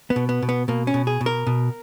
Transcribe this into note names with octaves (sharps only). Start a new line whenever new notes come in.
B3
B2
B3
B2
B3
B2 A#3
C#4
B2
G#4
B2
A#4
B2